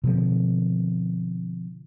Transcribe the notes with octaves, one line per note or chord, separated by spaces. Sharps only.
B2 D3 F3 C4